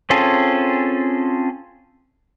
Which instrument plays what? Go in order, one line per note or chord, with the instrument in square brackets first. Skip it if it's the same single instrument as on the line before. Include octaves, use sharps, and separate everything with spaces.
[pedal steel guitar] C4 C#4 F4 G#4 A4